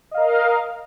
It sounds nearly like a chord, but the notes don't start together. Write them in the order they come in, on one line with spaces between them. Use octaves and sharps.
D#5 F5 A#4